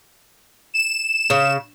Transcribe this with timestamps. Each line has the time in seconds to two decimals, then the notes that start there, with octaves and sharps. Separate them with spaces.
0.73 E7
1.30 C#3